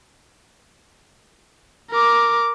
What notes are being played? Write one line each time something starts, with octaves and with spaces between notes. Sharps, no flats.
A#4 D6